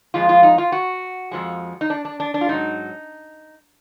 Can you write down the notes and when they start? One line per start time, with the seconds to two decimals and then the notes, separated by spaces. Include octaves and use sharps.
0.14 F2 F3 G#3 F4
0.29 F4
0.43 D#4
0.58 F4
0.72 F#4
1.31 F2 F3 G#3
1.81 D#4
1.90 D4
2.05 D4
2.20 D4
2.34 D4
2.41 F4
2.49 G#2 F#3 D#4